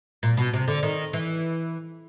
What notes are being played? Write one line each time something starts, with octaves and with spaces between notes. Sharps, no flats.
A#2
B2
C3
D3
D#3
E3